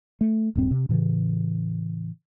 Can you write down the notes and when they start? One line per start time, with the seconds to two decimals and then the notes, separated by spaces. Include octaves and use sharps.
0.21 A3
0.55 D#1 G2 C4
0.71 C3
0.89 A2 C#3 E3